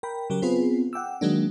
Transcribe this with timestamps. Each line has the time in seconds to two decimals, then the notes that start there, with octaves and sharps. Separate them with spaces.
0.03 A#4 G5 B5
0.30 C#3 F#3 G4 A#4
0.42 B3 C4 F4 G#4 B4
0.93 F#5 G5 D6 E6
1.21 D#3 F#3 G#3 A#3 D4